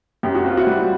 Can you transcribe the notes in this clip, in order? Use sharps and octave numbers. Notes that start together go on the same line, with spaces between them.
F#2 G4
F#4
C4 F4
E4 F#4
G3